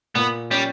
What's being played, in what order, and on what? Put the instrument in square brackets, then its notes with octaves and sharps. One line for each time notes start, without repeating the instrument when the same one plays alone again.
[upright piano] A#2 [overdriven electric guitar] B3
[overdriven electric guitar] G3 [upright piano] C#4